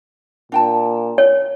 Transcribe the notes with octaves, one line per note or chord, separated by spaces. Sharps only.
A#2 D4 G5 A5
C#5